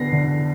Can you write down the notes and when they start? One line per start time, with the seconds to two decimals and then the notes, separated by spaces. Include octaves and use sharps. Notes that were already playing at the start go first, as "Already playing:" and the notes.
Already playing: D3 B3 A#6 C7
0.13 D3